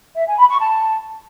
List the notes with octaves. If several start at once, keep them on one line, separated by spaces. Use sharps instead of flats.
E5
G#5
B5
C#6
A5